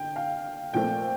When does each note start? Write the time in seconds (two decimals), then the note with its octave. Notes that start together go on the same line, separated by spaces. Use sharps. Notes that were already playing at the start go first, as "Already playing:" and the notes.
Already playing: D3 G5
0.16 F5
0.74 A#2 F3 A3 C4 G5